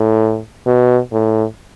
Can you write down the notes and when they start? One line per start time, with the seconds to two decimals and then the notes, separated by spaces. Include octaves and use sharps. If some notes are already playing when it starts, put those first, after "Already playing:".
Already playing: A2
0.66 B2
1.12 A2